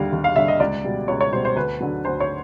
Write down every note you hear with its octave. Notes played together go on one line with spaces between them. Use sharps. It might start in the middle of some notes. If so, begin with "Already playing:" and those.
Already playing: D#2 D3 G3 F5
D#2
F5
D3 G3 E5
D#5
C#2 D5
B2 G3
C#2 C#5
C#5
B2 G3 C5
C5
D2 B4
D3 F#3
D2 C5
C#5